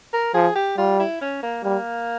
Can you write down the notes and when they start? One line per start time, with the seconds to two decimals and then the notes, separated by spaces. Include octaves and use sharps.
0.13 A#4
0.34 F3 G#4
0.56 G4
0.77 G3 F4
1.00 E4
1.21 C#4
1.43 A#3
1.64 G3 A#3